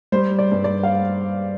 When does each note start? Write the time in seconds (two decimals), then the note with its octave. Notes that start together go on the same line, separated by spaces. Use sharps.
0.12 G3 C5
0.39 D5
0.52 G2
0.64 D5
0.83 F5